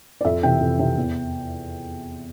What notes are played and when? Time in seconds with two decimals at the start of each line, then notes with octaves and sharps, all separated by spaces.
0.21 D5
0.25 F2 E5
0.43 C3 E3 G5
0.61 F2
0.79 C3 E3
0.98 E2